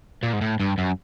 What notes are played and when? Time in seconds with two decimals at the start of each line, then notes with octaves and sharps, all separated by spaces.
0.23 A#2
0.33 G#2
0.41 A2
0.60 G2
0.78 F#2